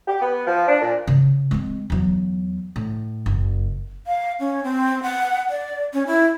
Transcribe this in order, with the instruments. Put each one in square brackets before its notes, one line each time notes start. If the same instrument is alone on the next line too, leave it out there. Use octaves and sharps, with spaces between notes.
[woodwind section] G4
B3
F3
D4
A#2
[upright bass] C#3
G#3 C4
E2 F#3
A2
F#1
[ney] F5
C#4
C4
F#5
D5
C#4
E4